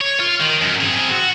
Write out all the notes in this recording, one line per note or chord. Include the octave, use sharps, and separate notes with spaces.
C#5
F4
D#3
F#2
C4 G#4
F#4